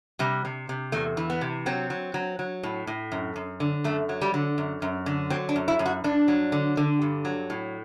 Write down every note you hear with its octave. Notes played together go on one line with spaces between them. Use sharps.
C3 G3
C3
C3
E2 A3
E3
B3
C3
F#3 C4
F#3
F#3
F#3
A2
A2
F#2
F#2
D3
F#2 A3
F#3
G3
D3
F#2
F#2
D3
F#3 C4
D4
F#2
E4
F#2
F#4
G2 D4
F#3
D3
D3
G2
F#3
A2